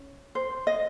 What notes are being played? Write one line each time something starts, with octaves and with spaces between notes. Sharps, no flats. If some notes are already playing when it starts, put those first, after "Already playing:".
Already playing: C#4
C5
D#5